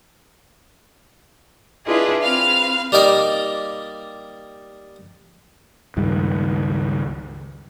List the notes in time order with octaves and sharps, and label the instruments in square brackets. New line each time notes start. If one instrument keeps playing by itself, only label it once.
[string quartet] D4 E4 F4 G#4 B4 D#5
C4 B4 F5 F6
[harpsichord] G3 A#3 D#4 D5 D#5
[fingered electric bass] C#2 G2 D#3